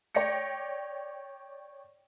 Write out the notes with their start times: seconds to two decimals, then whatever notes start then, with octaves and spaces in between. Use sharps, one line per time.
0.15 C#5 D5 G5 A#6 C#7